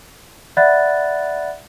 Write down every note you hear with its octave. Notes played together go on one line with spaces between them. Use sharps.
D5 E5 F#5 B5 F#6 A6